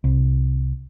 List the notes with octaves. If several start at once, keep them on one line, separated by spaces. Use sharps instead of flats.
C2